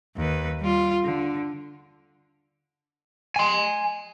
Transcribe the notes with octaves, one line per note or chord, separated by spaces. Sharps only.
D#2 B4
G3 F4
D3
G#5 C6